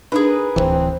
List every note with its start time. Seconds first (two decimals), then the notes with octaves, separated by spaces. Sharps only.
0.12 D4 D#4 G#4 A#4 B4
0.56 D1 C2 E3 C4